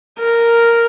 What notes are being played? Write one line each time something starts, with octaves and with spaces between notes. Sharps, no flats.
A#4